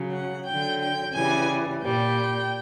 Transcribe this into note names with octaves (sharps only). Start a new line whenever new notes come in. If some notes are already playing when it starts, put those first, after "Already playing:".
Already playing: C#3 F#3
F#5
D3 F#3 G5
G5
C#3 E3 G3 G#5
A#2 G3 G5